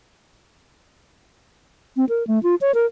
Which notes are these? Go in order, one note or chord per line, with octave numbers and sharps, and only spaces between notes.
C4
A#4
A3
F4
C#5
A#4